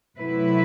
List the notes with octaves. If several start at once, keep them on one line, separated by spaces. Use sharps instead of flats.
C3 F#3 A3 E4 B4